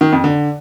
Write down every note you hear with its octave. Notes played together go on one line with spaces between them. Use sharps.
D#3
F2
D3